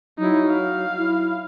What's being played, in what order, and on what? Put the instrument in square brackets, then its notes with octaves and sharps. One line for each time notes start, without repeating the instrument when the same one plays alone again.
[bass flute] F#3 [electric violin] D#4 E4
[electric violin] F5
[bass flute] E4